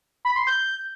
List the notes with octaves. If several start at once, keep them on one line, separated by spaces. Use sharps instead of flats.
B5
C6
G6